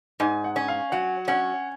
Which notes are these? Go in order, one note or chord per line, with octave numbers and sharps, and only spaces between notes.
G#2 G#5
F#5
C#4
F5
F#3 F#5
C#4 F#5